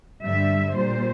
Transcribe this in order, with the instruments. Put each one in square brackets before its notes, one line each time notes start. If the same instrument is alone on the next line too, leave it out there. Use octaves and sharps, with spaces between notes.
[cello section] G2 D3 G3 E5
A#2 G3 C5